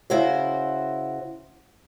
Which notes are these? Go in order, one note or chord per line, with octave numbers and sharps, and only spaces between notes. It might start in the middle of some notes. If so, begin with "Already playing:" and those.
C#3 E4 F#4 C5